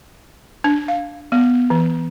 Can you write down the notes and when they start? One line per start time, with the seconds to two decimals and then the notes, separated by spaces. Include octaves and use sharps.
0.64 D4
0.88 F5
1.32 B3
1.70 E3